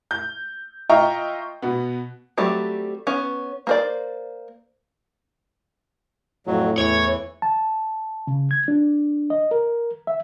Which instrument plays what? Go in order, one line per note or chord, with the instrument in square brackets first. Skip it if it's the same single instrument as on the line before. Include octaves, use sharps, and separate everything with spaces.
[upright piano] G6
F4 D#5 E5 G5 A#5 C#6
B2 B3
[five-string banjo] F#3 G3 A3 C4
B3 C#4
A#3 C5 D5
[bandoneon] F2 F#3 [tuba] A2
[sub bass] E2 [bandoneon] E3 [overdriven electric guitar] C#5
[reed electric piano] A5
C#3
G#6
D4
D#5
A#4
E5